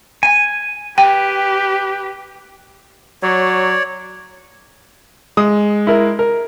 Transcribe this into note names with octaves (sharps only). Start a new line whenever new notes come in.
G#5
G4 B4 G5
F#3 C#5 D5
G#3 D#6
E4 A#4
A#4